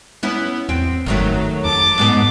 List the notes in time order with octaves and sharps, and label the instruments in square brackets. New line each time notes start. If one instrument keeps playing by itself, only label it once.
[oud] B3 C#4 E4
[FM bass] E2 [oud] C4
[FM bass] G1 [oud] D#3 F#3 A3
[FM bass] F2 [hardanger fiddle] A5 D6
[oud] G#2 B2 B3